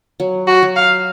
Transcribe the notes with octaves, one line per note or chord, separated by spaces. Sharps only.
F#3
F#4
F#3
F5